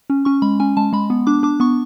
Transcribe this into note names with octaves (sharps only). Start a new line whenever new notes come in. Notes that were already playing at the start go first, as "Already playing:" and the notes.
C#4
C#4 C#6
G#3 B5
C#4 G#5
G#3 A5
G#3 B5
B3
D4 D6
D4 D6
B3 C#6